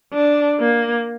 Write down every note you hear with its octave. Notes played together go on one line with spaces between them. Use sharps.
D4
A#3